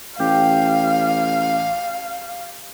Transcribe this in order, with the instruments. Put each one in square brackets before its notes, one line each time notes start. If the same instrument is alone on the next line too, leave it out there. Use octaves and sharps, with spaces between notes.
[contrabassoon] A1 [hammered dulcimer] G4 [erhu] F5